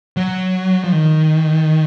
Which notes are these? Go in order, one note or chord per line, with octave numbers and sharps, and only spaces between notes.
F#3
F3
D#3